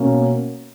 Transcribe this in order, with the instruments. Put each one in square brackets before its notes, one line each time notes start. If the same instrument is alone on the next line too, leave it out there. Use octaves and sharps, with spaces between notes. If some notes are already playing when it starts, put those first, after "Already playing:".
Already playing: [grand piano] B2 A#3 C#4